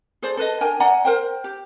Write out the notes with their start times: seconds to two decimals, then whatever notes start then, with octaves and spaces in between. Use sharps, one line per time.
0.22 G#4 A4 C5 D5
0.37 A4 B4 D#5
0.61 D4 A#4 G5 G#5
0.80 D5 F#5 G#5 A#5
1.05 A#4 C5 G5
1.44 G4